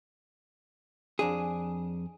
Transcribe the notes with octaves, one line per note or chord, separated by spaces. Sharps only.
F2 D4 G#4